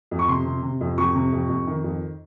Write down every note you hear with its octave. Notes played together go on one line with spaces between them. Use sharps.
F2
C#6
C3 C6
C3
C3
F2
F2 C#6
C3
F2
F2
D#3
F2